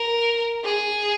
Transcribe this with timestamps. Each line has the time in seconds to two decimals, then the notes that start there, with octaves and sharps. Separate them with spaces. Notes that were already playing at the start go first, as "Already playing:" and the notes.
Already playing: A#4
0.64 G#4